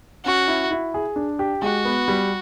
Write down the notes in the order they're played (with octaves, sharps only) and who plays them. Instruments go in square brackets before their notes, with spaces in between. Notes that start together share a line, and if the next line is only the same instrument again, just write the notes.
[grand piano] C#4 [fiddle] F#4
[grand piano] E4
E4
G#4
D4
G4
[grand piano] G#3 [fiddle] F#4
[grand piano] B3
G3